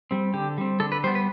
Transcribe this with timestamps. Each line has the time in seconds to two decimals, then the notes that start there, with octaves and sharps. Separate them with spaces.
0.11 G3 C4
0.34 D3 G4
0.58 G3 C4
0.80 D3 A4
0.92 B4
1.04 G3 C5
1.07 B3
1.15 B4